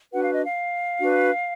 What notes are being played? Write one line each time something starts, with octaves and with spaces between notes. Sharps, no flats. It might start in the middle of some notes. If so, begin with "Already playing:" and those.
D4 F#4 B4 F#5
F5
D#5
F5
D4 F#4 B4